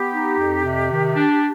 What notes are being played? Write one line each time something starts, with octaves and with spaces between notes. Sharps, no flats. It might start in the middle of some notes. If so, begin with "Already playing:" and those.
Already playing: B3 G4
D#4
F2
C3
D#3
D4